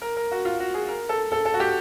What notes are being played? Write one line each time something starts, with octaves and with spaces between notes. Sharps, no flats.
A#4
A#4
F#4
F4
F#4
G#4
A#4
A4
A4
A4
F#4
G4